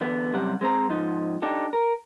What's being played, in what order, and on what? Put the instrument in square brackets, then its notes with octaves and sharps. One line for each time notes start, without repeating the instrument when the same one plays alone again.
[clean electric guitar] E2 D3 B3
C2 F#2 C3 G3 F#5
G#3 C4 C5 A#5
G#2 F3 D#4
D4 D#4 G4 A4
A#4